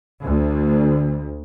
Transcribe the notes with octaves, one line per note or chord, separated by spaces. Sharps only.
D2